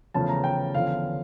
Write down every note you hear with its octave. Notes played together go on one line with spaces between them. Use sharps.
E2 C#3 F3 A3 C#4 A5
A#5
G5
E2 D3 F3 C#4 F5